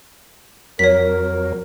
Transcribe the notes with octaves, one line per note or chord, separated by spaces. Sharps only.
F2 F#3 A#4 C#5 B6